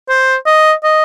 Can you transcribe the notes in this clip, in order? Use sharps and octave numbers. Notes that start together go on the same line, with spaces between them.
C5
D#5
D#5